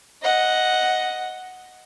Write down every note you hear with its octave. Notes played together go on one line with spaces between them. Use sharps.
D#5 F#5